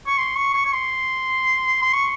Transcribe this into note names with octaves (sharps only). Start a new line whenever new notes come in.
C#6
C6
C#6
C#6
C#6
C6
C6
C#6